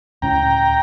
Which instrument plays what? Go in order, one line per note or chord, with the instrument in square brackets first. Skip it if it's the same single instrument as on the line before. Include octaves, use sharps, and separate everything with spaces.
[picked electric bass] C#2 A2 C#4 [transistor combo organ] G5 A#5